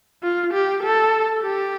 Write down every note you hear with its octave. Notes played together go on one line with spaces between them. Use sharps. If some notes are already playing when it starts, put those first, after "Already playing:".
F4
G4
A4
G4